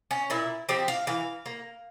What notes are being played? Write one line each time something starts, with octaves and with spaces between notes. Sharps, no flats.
C#4
A#2 E4
F3 C4 G4
F5
E3 F5
A#3